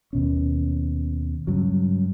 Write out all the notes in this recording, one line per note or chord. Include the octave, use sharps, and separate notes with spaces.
D#2 B2 C#4
G2 C#3 F#3